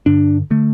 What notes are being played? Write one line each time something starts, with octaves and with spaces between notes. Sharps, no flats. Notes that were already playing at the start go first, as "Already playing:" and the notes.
G2 D3 D4
D3 A3